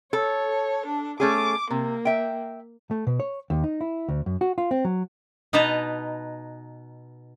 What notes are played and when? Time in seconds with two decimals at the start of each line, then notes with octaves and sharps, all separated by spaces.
0.13 A4 C#5
0.86 D4
1.20 A3 C#4 G#4 D6
1.71 C3 A#3
2.05 E5 G5
2.91 A3
3.07 B2
3.20 C#5
3.50 D#2
3.64 D#4
3.81 E4
4.08 D2
4.26 F#2
4.41 F#4
4.58 F4
4.71 C4
4.85 F#3
5.53 B2 D#4 B4 D#5 A5 A#5